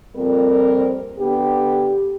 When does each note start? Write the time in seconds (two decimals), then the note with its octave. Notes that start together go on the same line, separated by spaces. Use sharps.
0.14 F2 A#2 G3 C4 A#4
1.18 D3 B3 G4